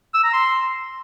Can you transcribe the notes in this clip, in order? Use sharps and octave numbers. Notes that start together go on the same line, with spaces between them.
E6
A#5
C6